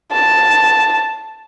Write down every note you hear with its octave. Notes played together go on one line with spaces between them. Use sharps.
A5